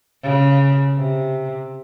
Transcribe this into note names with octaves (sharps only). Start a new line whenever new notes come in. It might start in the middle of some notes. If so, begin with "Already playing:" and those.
C#3
C3